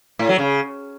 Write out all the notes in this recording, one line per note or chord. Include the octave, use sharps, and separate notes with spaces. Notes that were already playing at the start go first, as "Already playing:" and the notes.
A2
F#3
C#3